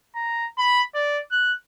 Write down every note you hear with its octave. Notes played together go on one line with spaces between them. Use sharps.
A#5
B5
D5
F#6